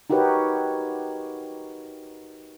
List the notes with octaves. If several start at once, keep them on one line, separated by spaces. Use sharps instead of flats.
D#4 F#4 G4 A#4 B4 C#5